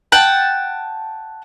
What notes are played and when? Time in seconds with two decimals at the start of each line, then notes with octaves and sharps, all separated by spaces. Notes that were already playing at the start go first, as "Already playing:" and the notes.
0.12 F#5 G5 A5